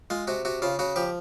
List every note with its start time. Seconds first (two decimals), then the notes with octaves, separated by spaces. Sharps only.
0.10 G#3 F4
0.27 C3 F#4
0.45 C3 F#4
0.62 C#3 F4
0.79 C#3 F#4
0.96 F3 G4